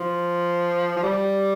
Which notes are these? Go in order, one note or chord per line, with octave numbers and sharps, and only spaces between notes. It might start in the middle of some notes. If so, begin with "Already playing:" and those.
Already playing: F3
F3
G3